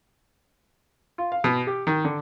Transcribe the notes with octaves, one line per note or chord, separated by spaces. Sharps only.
F4
F5
B2
G4
D#3
D3